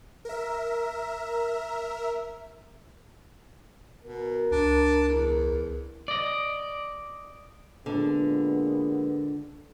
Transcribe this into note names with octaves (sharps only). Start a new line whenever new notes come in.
A#4 E5
B2 A#4
C#2 D4
E2
D5 D#5
A#2 D3 G#3 B3